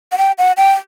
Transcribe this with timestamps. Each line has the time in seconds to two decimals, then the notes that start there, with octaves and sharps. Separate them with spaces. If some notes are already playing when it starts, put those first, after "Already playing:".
0.12 F#5
0.18 G5
0.38 F#5
0.57 G5